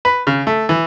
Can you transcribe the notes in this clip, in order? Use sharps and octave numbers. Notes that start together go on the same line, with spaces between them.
B4
C#3
A3
E3